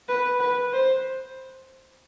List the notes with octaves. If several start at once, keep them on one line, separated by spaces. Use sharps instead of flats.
B4
B4
C5